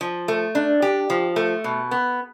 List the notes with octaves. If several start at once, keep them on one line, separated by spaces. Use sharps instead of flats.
F3
A3
D4
G4
F3
A3
B2
B3